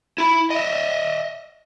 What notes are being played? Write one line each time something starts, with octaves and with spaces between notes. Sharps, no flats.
E4 B5
D#5 E5